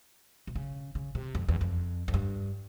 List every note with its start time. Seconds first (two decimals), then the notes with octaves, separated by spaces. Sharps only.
0.47 C3
0.55 C#3
0.95 C#3
1.15 C3
1.35 F2
1.49 E2
1.61 F2
2.08 F2
2.14 G2